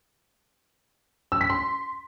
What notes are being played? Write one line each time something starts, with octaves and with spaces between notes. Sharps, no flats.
E6
B6
C6